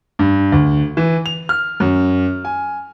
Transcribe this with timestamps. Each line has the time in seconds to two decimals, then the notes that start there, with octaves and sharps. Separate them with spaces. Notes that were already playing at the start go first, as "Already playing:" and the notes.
0.19 G2
0.52 D2
0.97 E3
1.26 F7
1.49 F6
1.80 F#2
2.45 G#5